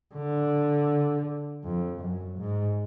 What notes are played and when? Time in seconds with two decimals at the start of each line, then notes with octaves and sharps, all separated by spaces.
0.15 D3
1.64 F2
2.01 F#2
2.38 G#2